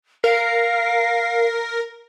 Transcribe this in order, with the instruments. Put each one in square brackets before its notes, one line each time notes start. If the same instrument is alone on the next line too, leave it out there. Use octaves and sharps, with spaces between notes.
[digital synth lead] A#4 [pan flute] F5